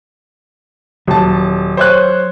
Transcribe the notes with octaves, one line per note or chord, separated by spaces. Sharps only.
D#1 F#3 A5
C5 C#5 F#6